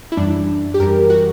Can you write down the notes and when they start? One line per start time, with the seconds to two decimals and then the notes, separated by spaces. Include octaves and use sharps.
0.12 E4
0.17 F#2 E3 G3 D4
0.74 G4
0.80 F#2 E3 G3 A#4
1.10 F#4